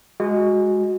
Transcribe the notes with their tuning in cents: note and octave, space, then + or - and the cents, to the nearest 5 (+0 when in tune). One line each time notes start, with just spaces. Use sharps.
G#3 +0 F#4 +0